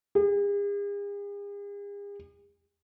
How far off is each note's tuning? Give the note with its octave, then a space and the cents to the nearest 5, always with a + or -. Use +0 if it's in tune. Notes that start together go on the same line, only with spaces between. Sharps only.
G#4 -45